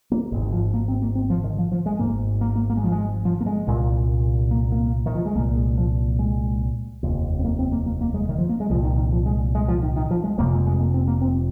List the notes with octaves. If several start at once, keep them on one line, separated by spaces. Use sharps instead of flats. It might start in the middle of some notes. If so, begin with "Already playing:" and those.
A#3
G#1 G#2
D#3
F3
A#3
C4
A#3
C4
F3
D#3
F3
F3
G#3
G#1 G#2 A#3
A#3
A#3
A#3
G#3
F3
G#3
F3
A#3
G#3
C2 A#2
A#3
A#3
D#3
F3
G#3
C2 A#2 A#3
G#3
F3
G#3
F1 D#2
C4
A#3
C4
A#3
A#3
A#3
G#3
D#3
F3
A#3
G#3
C2 A#2 F3
D#3
D#3
F3
G#3
G#3
F3
D#3
D#3
F3
G#3
F1 F2 C3 A#3
G#3
G#3
A#3
C4
A#3
C4